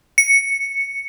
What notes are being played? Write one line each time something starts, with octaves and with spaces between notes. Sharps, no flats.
C#7